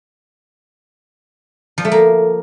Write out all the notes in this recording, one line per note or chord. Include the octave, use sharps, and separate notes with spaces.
F3
A3
A#3